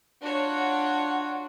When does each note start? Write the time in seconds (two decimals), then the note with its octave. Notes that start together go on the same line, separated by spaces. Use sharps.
0.22 D4 F4 F#4 C#5
0.57 F#5